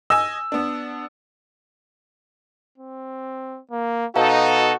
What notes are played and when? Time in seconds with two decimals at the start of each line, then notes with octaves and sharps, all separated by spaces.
0.10 D#5 G#5 E6
0.52 B3 D4
2.78 C4
3.71 A#3
4.16 B2 D#4 F#4 A4 F5 A5 A#5